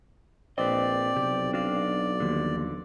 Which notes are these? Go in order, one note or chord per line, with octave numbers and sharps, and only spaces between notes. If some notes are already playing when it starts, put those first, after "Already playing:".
A#1 C4 B4 D5 D#5
B1 C3 G4
D4 F#4 D5 F5
D#2 D3 F3 F#3